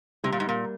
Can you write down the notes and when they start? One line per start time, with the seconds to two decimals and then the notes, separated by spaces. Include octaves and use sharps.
0.24 C3 G3
0.32 A#2
0.40 G#2
0.47 A#2 A#3